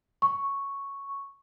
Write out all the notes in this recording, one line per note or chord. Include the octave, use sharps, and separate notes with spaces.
C#6